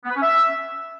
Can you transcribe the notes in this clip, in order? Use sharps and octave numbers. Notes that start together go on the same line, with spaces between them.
B3
B4
C#4
E5